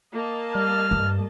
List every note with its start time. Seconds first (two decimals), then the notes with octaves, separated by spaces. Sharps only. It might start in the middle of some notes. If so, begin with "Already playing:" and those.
0.12 A#3 D#5 A5
0.55 G3 F6
0.91 G2